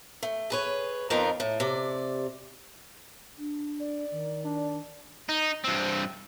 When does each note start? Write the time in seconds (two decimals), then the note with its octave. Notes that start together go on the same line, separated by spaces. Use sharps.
0.23 A3
0.50 G#4 B4 C#5
1.10 F2 B3 D#4 F4 A#4 G5
1.40 A2
1.60 C3 D5
3.37 D4
3.80 D5
4.10 D#3
4.44 D4
5.29 D#4
5.64 G2 C4